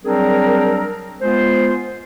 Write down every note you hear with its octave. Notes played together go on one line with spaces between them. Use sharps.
F#3 G3 C4 D4 G#4 A#4
G#3 B3 F4 C5